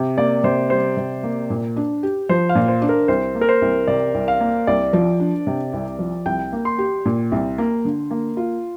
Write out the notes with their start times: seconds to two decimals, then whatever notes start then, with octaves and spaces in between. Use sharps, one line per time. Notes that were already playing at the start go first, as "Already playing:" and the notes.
Already playing: C3
0.18 A#3 D5
0.44 C3 C5
0.70 G3 C5
0.97 C3
1.23 A#3
1.50 A#2
1.76 D4
2.03 G4
2.29 F3 C5
2.49 F5
2.55 A#2
2.68 C5
2.82 D4
2.89 A#4
3.08 C2 C5
3.35 A#3
3.41 A#4
3.49 C5
3.62 C2
3.88 C3 D5
4.14 C2
4.28 F5
4.40 A#3
4.67 C2 D5
4.93 F3
5.20 D4
5.47 C3
5.73 C2
5.99 F3
6.26 C2 G5
6.52 A#3
6.65 C6
6.78 G4
7.05 A#2
7.32 C2
7.58 A#3
7.85 D3
8.11 A#3
8.37 F4